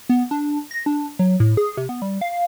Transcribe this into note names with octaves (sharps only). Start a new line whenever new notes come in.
B3
D4
A#6
D4
F#3
A2
G#4
C3
B3
G3
F5